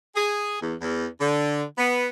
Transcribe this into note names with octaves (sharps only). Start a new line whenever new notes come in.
G#4
E2
E2
D3
B3